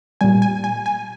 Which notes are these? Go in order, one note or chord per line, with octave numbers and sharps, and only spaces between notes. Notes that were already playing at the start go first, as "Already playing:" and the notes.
A#2 G3 G#5
G#5
G#5
G#5